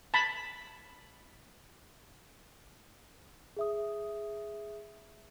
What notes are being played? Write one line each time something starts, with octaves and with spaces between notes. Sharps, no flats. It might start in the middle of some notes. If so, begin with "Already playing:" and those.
A5 B5
G#4 E5 D#6